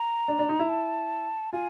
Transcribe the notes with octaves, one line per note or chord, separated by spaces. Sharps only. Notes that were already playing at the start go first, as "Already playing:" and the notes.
Already playing: A#5
D4
D4
D#4
E4
A5
F4 G#5